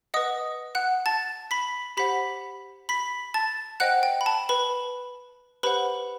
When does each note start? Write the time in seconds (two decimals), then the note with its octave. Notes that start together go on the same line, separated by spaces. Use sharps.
0.14 B4 D#5 F#5 D#6
0.75 F#5 F#6
1.06 A5 A6
1.51 B5 B6
1.97 G4 C5 F#5 B5 B6
2.89 B5 B6
3.34 A5 A6
3.80 C5 D#5 F#5 G5 F#6
4.03 G5
4.21 B5
4.26 A5
4.49 B4 B5
5.63 G4 B4 C5 F#5 B5